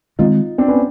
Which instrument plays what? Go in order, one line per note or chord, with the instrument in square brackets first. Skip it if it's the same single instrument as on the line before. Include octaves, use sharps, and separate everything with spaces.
[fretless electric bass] D#3 G#3 C4 [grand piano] D#4 F4
[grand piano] C4 D4
B3 C#4